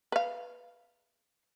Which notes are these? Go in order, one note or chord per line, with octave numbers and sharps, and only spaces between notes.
B4 F5